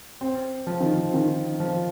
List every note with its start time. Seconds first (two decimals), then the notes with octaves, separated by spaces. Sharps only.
0.21 C4
0.67 F3
0.80 D#3
0.95 F3
1.14 D#3
1.60 F3